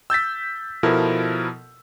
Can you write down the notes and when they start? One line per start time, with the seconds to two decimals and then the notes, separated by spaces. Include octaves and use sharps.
0.10 E6 G6 A6 B6
0.83 B2 F3 E4 A4 A#4